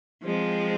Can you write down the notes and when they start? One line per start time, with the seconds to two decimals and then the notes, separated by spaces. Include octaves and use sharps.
0.23 F3 G#3 C4